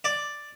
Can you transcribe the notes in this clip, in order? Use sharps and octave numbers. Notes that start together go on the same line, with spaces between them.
D5